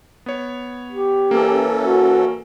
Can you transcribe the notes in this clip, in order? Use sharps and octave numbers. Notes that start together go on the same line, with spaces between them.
B3 C#5
G4
E3 A#3 C#4 A4
F#4